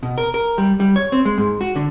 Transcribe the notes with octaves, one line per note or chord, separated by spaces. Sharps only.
B2
A#4
A#4
G3
G3
C#5
C4
G#3
G#2
F#4
D3